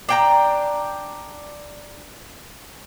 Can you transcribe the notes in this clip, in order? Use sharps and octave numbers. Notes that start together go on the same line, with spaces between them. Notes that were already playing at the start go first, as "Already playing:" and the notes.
D4 G5 A#5